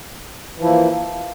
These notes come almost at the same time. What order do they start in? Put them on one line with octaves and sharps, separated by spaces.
E3 F3 E4 A#3